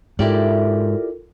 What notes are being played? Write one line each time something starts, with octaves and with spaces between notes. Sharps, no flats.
G#2 E4 F4 G4 A4 A#4 D5